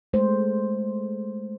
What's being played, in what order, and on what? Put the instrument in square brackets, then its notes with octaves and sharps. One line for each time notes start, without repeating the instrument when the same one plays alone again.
[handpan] G#3 A3 C5